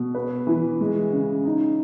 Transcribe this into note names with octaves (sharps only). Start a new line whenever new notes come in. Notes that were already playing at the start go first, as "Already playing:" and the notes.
Already playing: B2
B4
E3
G#3
C#3
D#4